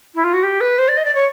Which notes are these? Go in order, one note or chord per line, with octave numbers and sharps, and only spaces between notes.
E4
F4
F#4
G4
B4
C5
D5
D#5
D5
C#5